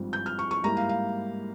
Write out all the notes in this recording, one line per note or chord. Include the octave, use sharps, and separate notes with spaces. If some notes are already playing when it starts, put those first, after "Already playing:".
Already playing: G#1 G2 F3 C4
G6
F6
C#6
C#6
G#2 G3 A#3 E4 A#5
F5
F5